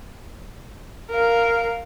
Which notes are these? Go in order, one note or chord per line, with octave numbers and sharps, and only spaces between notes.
A#4 F5